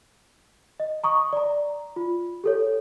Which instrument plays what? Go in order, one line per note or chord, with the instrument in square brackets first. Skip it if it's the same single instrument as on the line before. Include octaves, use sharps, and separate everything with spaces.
[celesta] D#5
A#5 C#6 D#6
D5 A#5
F4
G4 A4 C#5